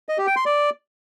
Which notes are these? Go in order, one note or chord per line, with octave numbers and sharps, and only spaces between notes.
D#5
G4
G5
C6
D5